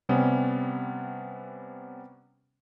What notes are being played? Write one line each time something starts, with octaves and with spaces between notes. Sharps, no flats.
C3 G3 B3 C#4